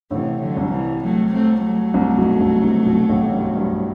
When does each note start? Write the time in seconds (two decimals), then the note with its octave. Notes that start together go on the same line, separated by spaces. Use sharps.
0.11 A1 A2 C3 E3
0.41 D3 F#3
0.56 C2 C3
0.72 E3 G3
1.03 F#3 A3
1.33 A3 C4
1.63 F#3 A3
1.94 C2 C3
2.17 B1 B2
2.40 C2 C3
2.63 C2 C3
2.86 B1 B2
3.09 A1 A2
3.32 G2
3.56 G2